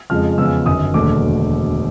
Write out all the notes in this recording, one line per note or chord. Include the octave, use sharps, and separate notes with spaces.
F2 C#3 F3 G#3 F6
E2 C#3 F3 G#3 E6
G1 F#2 D#3 D#6
E1 D#2 D3 F#3 A3 D6